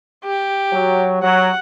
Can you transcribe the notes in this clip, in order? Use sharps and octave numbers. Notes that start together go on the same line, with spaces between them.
G4
F#3
F#3 F#5